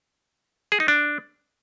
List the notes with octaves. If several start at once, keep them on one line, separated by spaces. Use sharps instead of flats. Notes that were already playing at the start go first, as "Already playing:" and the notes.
G#4
D#4
D4